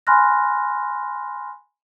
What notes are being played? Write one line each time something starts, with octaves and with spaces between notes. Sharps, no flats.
G#5 B5 C6 F6 F#6 A#6